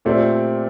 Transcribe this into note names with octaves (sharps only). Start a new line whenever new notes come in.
A#2 A3 C4 G4 D5